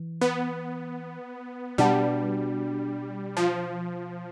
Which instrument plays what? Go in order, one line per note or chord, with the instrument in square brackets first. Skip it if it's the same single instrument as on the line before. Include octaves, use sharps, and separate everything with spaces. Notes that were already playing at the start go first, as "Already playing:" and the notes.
Already playing: [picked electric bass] E3
[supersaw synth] B3
[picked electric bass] B2 B3 D4 [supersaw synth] G3
[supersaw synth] F3